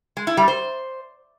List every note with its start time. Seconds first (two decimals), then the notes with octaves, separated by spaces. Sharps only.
0.17 G#3
0.27 E4
0.37 G3
0.48 C5